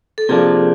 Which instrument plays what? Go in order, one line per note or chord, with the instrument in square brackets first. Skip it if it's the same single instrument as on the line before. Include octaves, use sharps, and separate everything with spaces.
[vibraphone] A4
[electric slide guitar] C3 F3 A#3 D4 [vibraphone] G#4